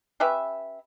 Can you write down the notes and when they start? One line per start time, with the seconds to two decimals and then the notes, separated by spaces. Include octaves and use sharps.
0.20 C#4 G4 B4 E5